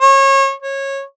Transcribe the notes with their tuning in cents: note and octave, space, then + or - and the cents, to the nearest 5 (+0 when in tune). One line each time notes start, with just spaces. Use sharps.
C#5 -30
C#5 -20